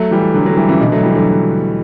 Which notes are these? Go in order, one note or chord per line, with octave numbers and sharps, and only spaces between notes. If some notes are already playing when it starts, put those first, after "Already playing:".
Already playing: F#3 A3
E3 G3
D3 F#3
D3 F#3
E3 G3
C#3 E3
B2 D3
F#3 A3
E3 G3
D3 F#3